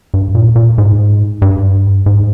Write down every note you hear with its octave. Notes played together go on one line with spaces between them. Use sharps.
G2
A#2
A#2
G#2
G2
G#2